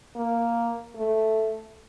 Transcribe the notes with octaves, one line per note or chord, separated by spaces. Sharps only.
A#3
A3